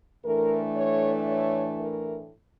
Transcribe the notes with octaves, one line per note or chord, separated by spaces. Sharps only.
A2 E3 A3 D4 A#4
C#5
C#5
A#4